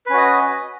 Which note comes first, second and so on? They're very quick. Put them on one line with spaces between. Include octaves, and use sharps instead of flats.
B4 C#4 F#4 D#5